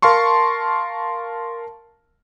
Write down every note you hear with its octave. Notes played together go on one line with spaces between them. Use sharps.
A#4 F5 A5 C6 C#6